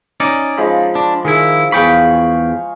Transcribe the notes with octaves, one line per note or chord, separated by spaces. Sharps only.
C#4 D#4 D5
F3 G#3 B5
D4
D#3 E4 G#4
E2 G#4 F5 G5 B5 C#6